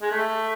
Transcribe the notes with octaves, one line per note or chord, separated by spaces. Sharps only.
G#3
A3